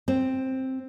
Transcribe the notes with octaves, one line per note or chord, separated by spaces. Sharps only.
C4